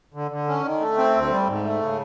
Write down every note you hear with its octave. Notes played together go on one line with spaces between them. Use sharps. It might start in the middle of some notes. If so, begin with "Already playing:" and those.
D3
D3
C#4
D#3
A3
C4
D2
G3
G#2
A3
C#3